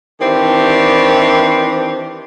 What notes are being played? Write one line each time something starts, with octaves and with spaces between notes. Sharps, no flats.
D#3 E3 C4 D4 G4